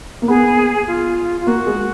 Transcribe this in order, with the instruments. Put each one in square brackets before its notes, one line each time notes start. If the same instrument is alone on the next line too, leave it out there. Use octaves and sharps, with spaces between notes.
[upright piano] A#3
[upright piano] B3 [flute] G#4
[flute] F4
F4
[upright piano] A#3 [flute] F#4
[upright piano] G#3